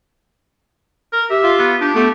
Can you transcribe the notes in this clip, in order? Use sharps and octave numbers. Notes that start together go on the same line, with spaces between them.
A#4
G4 E5
F4
B3
D4 G4
A3 B3